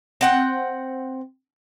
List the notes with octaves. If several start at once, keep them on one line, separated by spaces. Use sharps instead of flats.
C4 F#5 G5